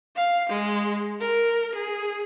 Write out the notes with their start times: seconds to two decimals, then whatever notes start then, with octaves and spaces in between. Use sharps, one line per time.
0.16 F5
0.50 G#3
1.21 A#4
1.75 G#4